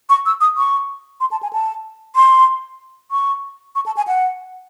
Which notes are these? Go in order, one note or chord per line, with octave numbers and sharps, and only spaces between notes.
C#6
E6
D#6
C#6
C6
A5
G#5
A5
C6
C#6
C#6
A5
G#5
F#5